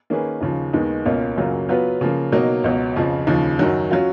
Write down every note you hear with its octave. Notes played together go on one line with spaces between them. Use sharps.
D#3 A#3 C#4 G#4 B4
D#2 C#3 F3
D#2 D#3 G#3 B3 D#4
C#2 B2 A#3 C#4 F4
F#2 C#3 F#3 A#3 F4
F#3 B3 F4 B4
C#3 F3 A#3
B2 F#3 A#3 D#4
C#2 B2 F#3
F2 C#3 F3
D#2 C#3 F3
F#2 D#3 F#3
F#3 C#4 F4